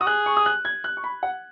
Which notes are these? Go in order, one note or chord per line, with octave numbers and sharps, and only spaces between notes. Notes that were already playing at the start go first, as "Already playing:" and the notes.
F#4 D#6
G#4 F#6
C#6
D#6
F#6
G#6
F#6
C#6
B5
F#5